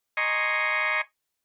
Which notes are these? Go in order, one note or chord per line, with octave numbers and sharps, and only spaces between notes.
D#5 G#5 A#5 C6 C#6